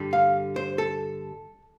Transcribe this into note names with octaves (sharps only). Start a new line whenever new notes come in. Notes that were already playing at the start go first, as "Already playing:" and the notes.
Already playing: G2 D3 G3
F5
C5
A4